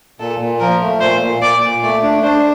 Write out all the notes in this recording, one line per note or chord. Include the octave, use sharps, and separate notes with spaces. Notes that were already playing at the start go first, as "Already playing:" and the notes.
A#2 A4
A#2
F3 A#4
A3
A#2 C5
A#2
A#2 D5
A#2
A3 D5
D4
D4 C5